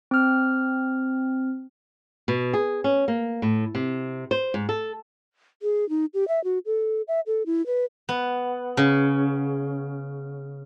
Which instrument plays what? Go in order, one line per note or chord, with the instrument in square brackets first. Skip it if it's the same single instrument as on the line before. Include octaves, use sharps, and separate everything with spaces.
[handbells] C4 F6
[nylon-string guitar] B2
G#4
C#4
A#3
A2
C3
C5
G#2
A4
[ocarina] G#4
D#4
G4
E5
F#4
A4
E5
A4
E4
B4
[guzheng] B3
C#3